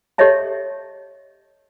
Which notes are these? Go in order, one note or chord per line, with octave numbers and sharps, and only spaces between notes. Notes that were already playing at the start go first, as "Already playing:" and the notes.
G4 A4 C#5 D#5 E5 A5